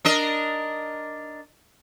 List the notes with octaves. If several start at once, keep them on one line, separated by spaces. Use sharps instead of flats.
D4 A#4 D#5